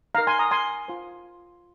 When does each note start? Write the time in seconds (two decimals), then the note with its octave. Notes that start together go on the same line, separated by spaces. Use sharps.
0.15 D#4 A#4 F5 A#5
0.27 G#5 C6
0.39 A#5 D#6
0.51 G#5 C6
0.88 F4 C5